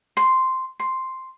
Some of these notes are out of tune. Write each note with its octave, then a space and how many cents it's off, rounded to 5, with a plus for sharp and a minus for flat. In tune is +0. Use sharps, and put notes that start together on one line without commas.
C6 -5
C6 +0